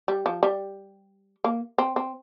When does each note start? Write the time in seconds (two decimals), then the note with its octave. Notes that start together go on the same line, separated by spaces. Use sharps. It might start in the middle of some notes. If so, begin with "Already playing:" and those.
0.08 G3
0.26 F3
0.43 G3
1.44 A#3
1.78 C4
1.96 C4